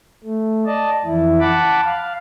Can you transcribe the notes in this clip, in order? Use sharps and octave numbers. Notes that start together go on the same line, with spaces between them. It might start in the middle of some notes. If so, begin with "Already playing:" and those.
A3
D5 D#5 A5
F2 E3 E4
F#5 A5 B5 D6
F5